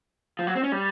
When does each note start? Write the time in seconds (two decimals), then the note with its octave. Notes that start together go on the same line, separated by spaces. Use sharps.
0.39 F3
0.47 F#3
0.56 C4
0.63 C#4
0.72 G3